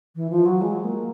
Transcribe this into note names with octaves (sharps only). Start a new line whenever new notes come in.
E3
F3
F#3
G#3
A#3